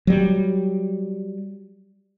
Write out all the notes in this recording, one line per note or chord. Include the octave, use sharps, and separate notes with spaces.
F#3 G3